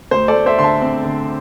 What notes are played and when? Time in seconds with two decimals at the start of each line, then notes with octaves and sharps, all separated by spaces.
0.11 D2 C5
0.28 A4 D5
0.34 A3
0.46 C5 E5
0.58 D3 C6
0.64 E5 A5
0.82 C4
1.05 D3